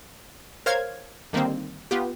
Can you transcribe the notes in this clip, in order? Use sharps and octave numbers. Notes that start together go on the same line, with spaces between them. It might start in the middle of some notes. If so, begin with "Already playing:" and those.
A#4 C5 C#5 F5 F6 G#6
D3 D#3 G3 A#3 C4
B3 F4 G4